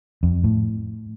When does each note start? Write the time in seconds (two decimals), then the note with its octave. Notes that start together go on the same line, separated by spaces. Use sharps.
0.23 F2
0.44 A2